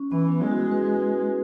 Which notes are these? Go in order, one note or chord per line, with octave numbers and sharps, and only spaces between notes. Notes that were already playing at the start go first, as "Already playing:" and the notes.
Already playing: C#4
E3 B3
B3
C#4
G#3 E4
F#4
G#4
B4
B4